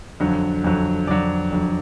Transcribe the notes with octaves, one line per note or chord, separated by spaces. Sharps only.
F2 D3 F#3
F2 D3 F#3
F2 D3 F#3 D5 D6
F2 D3 F#3